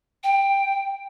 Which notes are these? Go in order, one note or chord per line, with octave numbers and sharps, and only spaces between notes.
G5